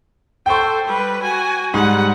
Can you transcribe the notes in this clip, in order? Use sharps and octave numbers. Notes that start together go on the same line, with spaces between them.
A4 C5 G5 C#6
G3 B4
F#4 G#5
G#2 G3 F#5